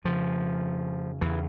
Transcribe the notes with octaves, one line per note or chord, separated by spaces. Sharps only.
F2 C#3 F3
E2 C#3 E3